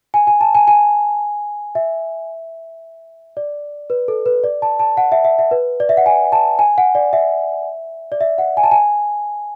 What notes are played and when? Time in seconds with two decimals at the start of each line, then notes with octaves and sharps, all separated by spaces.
0.14 G#5
0.27 G#5
0.41 A5
0.55 G#5
0.68 G#5
1.75 E5
3.37 D5
3.90 B4
4.08 A4
4.26 B4
4.44 D5
4.62 A5
4.79 A5
4.97 F#5
5.12 E5
5.25 E5
5.39 E5
5.51 B4
5.80 D5
5.89 E5
5.97 F#5
6.06 G#5
6.32 A5
6.59 G#5
6.78 F#5
6.95 D5
7.13 E5
8.12 D5
8.21 E5
8.38 F#5
8.57 G#5
8.63 A5
8.71 G#5